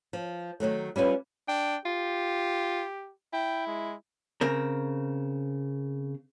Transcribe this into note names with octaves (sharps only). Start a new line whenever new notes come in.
F3
D#3 E3 F#3 A3
G3 C#4 F4 B4
D4 G5
F4 G4
E4 G5
G#3
C#3 C4 A#4